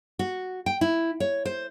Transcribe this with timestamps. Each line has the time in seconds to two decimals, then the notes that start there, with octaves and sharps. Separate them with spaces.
0.19 F#4
0.66 G5
0.81 E4
1.20 C#5
1.45 C5